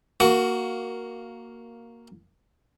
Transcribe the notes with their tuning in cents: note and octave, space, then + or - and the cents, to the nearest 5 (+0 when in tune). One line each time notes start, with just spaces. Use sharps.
A#3 +0 F#4 +0 C#6 +25